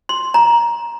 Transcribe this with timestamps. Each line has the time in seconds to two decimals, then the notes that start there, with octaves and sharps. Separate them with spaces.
0.09 C6
0.34 A#5